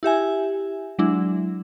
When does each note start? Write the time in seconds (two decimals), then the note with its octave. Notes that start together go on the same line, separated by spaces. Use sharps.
0.03 E4 G4 E5 G#5
0.99 F#3 G#3 D4 E4